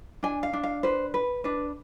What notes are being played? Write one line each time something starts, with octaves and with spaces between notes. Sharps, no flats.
D4 G#5
F5
D4
F5
B4 C5
B4
D4 B4